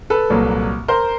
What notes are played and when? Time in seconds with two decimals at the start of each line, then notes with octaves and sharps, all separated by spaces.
0.10 A4 B4
0.30 C2 A#2 F#3 A#3
0.88 A#4 C5